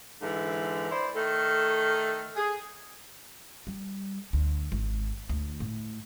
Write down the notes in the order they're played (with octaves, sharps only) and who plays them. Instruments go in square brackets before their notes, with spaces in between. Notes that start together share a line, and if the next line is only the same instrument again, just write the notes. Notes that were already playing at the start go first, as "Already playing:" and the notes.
[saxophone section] G#2 D3 E3
E4 C5 D5
D#3 A3 A4
G#4
[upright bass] G3
D2
G#1
D2
A2